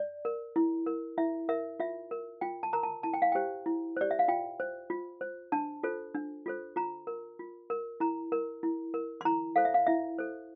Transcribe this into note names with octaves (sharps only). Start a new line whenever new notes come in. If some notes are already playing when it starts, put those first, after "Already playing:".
Already playing: D5
A#4
E4
A#4
E4 E5
A#4 E5
F4 E5
A#4
F4 G5
A5
A#4 A#5
A5
E4 A5
G5
F5
G4 C5 G5
E4
G4 C5 D5
E5
F5
F4 G5
C5
F4
C5
D4 A5
F4 A4 C5
D4
F4 A4 C5
F4 A#5
A#4
F4
A#4
E4 A#5
A#4
E4
A#4
C6
E4 A#5
A4 C5 F5
E5
F5
E4 E5
A4 C5